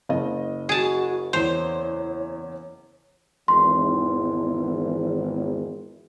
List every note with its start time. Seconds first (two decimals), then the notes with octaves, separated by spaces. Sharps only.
0.09 F#1 D#5
0.69 F#4 G#4 A5
1.33 E2 C5 C#5 C6
3.48 G#1 E2 C6